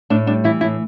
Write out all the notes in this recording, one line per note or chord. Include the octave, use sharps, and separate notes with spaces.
A2 D4
G3 D4
E3 E4
A2 E4